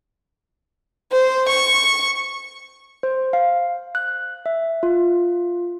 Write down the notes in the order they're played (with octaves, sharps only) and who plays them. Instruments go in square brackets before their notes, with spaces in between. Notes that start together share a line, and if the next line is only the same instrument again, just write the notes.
[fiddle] C5
C#6
[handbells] C5
F5
F#6
E5
F4